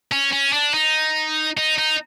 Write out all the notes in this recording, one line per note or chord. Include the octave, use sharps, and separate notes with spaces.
C#4
C#4
D4
D#4
D#4
D#4